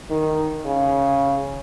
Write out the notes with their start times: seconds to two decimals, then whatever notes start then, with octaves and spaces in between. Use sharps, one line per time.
0.11 D#3
0.66 C#3